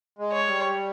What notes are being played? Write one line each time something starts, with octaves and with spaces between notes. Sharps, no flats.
G#3
C#5
G3